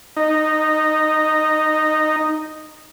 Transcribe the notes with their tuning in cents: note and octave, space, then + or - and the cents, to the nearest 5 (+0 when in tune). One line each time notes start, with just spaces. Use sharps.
D#4 -10